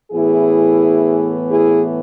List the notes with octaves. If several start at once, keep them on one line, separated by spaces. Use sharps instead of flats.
A2 E3 B3 E4 G#4
E4 G#4